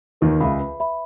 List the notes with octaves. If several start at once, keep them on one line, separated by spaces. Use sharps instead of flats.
D#2 D#3 B4
C#2 C#3 E5 B5
B4
E5 B5